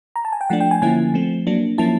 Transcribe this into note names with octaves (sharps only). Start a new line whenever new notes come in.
A#5
A5
G#5
G5
F3 A3 D4 F#5
G5
G#5
D3 F3 A#3 C#4 E4 G#5
F3 A3 C4
F#3 A#3 D4
F3 A#3 C#4 E4 A5